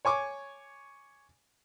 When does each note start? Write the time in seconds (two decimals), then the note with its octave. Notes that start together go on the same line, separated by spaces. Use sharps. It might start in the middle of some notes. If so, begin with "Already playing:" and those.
0.05 C#5 G#5 C#6 D6